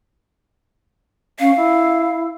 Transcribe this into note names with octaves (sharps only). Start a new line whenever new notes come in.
C#4 F5
E4